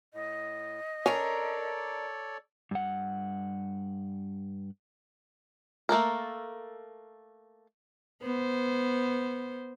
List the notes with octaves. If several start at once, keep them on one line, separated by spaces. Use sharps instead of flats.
A2 D#5
C#4 D4 A4 A#4 C#5 D5
G2 F#5
A3 A#3 A4 A#4
B3 C5